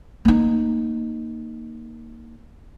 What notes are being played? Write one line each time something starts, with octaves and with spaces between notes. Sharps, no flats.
A#3 D#4